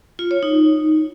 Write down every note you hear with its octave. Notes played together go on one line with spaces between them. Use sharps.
F4
C#5
D#4